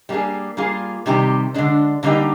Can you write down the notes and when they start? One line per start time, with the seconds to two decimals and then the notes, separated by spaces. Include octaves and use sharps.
0.09 G3 A#3 D4 G#4
0.57 G3 A#3 F4 G#4
1.06 C3 D#3 G3 C4 G4
1.54 D3 G#3 D4
2.03 D3 G3 A#3 D#4 G4